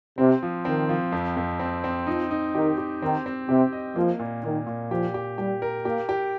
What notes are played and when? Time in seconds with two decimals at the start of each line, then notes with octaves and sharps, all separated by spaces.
0.18 C3 C4
0.43 F3
0.65 D#3 C4
0.89 F3
1.12 F2
1.37 F2
1.60 C4
1.84 C4
2.07 F3 D#4
2.31 D#4
2.55 D#3 G4
2.78 G4
3.02 D#3 C4
3.26 C4
3.49 C3 G4
3.73 D#5
3.96 F3 A#3
4.19 A#2
4.43 A#2 D#3
4.67 A#2
4.91 F3 G4
5.14 G4
5.38 G3 G4
5.62 A#4
5.85 A#3 G4
6.09 G4